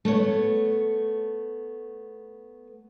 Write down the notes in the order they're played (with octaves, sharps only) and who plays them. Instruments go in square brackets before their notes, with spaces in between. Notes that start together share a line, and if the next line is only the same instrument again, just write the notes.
[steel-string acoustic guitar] A3 B3 C#5